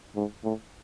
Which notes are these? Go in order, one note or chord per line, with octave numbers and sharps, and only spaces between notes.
G#2
A2